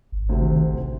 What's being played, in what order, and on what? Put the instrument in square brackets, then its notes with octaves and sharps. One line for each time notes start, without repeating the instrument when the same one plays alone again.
[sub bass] G#1
[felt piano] D2 C3
[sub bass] D#3
A1